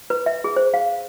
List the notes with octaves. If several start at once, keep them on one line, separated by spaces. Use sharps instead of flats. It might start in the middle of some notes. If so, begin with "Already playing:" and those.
B4
E5
G#4
C5
F5